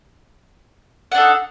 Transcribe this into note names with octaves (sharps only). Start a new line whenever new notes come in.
D4 D#4 A4 F#5